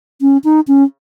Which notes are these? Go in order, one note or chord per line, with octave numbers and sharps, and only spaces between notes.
C#4
D#4
C#4